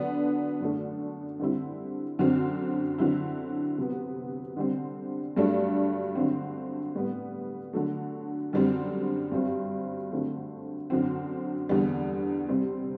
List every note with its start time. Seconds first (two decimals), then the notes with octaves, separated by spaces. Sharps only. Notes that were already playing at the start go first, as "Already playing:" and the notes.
Already playing: D3 F#3 B3 D4
0.60 F#2 D3 A3 D4
1.40 D3 G3 C4 E4
2.19 F#2 D3 F#3 C4
2.98 D3 F#3 C4 E4
3.78 C3 F#3 B3
4.57 D3 G3 C4
5.36 G2 F#3 A3 D4
6.15 D3 F#3 C4
6.95 A2 G3 B3
7.73 D3 F#3 A3
8.53 F#2 D3 G3 C4
9.32 G2 F#3 C4
10.12 D3 F#3 A3 C4
10.90 F#2 D3 F#3 C4
11.69 E2 D3 G3
12.49 C3 G3 C4